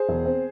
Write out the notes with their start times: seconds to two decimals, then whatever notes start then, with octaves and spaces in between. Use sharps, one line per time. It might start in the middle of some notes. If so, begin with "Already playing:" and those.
Already playing: G#4 C5
0.09 E1
0.26 C4